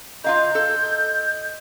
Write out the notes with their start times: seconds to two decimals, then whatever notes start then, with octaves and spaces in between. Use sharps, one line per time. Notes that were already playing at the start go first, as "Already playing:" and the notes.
0.24 F4 D#5 F5 A#5 G6
0.55 A4